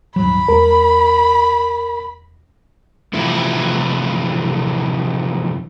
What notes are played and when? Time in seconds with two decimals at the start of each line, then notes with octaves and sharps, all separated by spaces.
0.16 D#1 G#2 F#3 B5
0.48 E2 G#3 A#4
3.13 F2 C3 E3 A3 E4